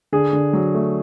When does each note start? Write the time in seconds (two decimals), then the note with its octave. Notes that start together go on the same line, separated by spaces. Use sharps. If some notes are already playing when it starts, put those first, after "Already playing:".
0.12 D3 G#4
0.33 D3
0.53 F#3
0.74 A3